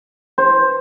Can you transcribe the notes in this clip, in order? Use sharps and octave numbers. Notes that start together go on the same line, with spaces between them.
C5